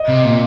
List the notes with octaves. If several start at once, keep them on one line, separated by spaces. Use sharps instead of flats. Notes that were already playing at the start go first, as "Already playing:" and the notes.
Already playing: D#5
C3
A#2